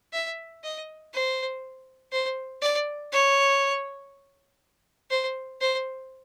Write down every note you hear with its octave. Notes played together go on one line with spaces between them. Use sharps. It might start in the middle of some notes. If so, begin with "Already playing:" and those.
E5
D#5
C5
C5
D5
C#5
C5
C5